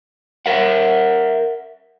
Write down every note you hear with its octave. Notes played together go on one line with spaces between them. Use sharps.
A#4 E5 F#5